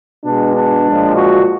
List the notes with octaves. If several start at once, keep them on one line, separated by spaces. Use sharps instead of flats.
B2 G#3 D4
D4
A#2 F3 G#3
F#4